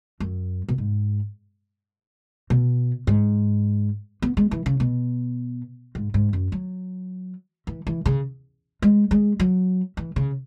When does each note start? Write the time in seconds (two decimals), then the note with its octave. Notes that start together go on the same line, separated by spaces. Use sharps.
0.20 F#2
0.69 B2
0.78 G#2
2.50 B2
3.07 G#2
4.22 B3
4.37 G#3
4.51 E3
4.66 C#3
4.80 B2
5.95 G#2
6.14 G#2
6.33 F#2
6.52 F#3
7.67 E3
7.87 E3
8.06 C#3
8.82 G#3
9.11 G#3
9.40 F#3
9.97 E3
10.16 C#3